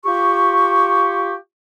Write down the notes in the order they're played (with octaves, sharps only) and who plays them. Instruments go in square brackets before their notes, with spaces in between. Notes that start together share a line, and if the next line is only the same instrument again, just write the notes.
[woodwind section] F4 G4 C#6